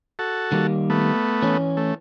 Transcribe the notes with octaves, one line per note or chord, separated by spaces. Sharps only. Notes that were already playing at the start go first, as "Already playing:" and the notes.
F#4 A4
D#3 G3 A#3
A3 B3
E3 C#4
A3